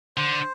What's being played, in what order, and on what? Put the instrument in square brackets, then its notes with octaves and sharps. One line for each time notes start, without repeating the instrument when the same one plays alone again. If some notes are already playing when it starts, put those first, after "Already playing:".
[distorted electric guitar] D3 [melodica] C5